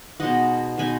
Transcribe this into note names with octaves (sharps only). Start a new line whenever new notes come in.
B2 G#3 D#4 D#5 F#5
B2 G#3 D#4 G#5 B5